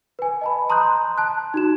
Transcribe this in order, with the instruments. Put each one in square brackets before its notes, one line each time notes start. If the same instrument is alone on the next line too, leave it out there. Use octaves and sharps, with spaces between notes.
[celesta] B4 G#5
D#5 A5 B5
A5 A#5 C6 D#6 F#6 G6
A5 F#6
D#4 F#4 E7